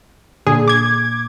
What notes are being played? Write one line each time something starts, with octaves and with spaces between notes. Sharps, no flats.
A#2 D3 G#4
D6 G#6